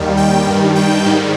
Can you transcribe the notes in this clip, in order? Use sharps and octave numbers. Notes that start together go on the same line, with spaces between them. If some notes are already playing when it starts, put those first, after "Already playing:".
Already playing: D#2 D#3 G3
G5
G2 D#3 G3
G5
G#2 D#3 G3